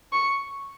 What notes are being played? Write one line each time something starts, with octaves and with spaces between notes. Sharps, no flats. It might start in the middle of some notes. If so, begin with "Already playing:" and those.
C#6